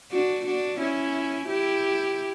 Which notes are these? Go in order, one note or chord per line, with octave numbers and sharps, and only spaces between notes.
D4 F#4
D4 F#4
C#4 E4
E4 G4